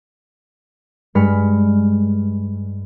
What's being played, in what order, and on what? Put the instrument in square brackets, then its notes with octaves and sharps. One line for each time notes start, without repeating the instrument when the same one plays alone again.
[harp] G2 G#3 B5 F6 B6 C#7